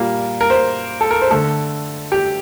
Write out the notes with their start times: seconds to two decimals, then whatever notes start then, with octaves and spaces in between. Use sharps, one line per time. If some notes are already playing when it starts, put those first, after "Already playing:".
Already playing: A#2 G3 A#3
0.41 A#4
0.50 C5
1.01 A4
1.11 A#4
1.21 C5
1.31 D3 A3 A4
2.12 G4